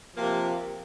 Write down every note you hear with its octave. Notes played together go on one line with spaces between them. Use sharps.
C3 F3 A#3